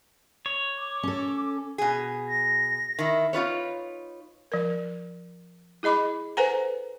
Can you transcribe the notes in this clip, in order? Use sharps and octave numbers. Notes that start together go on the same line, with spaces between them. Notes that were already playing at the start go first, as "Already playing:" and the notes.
C#5
D6
C#4 A4
B2 G#4
A#6
D#3 E4
D#4 F4 B4 C#5
F3 A#4
E4 G#4 D#5 B5 D6
A4 B4 C5 F#5 G#5 A#5